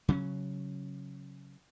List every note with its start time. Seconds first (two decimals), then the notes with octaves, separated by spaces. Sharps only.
0.08 C#3 F#3 C4 C#4